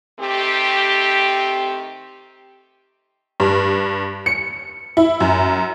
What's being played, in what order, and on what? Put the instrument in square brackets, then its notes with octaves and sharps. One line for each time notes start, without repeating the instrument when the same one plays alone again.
[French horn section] D#3 A3 C4 G4
[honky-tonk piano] G2
C#7
E4
F#2